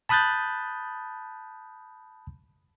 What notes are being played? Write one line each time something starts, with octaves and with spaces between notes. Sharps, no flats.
A5 B5 D#6 F#6 G6 A6